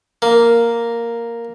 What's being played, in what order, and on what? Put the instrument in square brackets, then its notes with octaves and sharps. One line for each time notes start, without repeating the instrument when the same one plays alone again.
[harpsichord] A#3